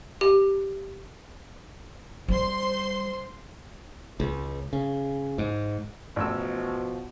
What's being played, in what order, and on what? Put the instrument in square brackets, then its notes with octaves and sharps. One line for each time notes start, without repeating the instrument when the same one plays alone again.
[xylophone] G4
[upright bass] G3 [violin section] C5 C6
[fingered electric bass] C#2
C#3
G#2
[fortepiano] A1 E6 [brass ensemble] B2 F3